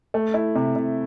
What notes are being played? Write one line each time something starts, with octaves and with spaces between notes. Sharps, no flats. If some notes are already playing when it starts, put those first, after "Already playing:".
A3
E4
C3
C3